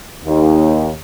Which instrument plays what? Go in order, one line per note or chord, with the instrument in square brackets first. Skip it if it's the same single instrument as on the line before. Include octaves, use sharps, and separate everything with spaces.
[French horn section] D#2